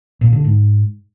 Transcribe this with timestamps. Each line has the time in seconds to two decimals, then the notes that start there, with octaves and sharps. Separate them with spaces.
0.21 A#2
0.33 D3
0.44 G#2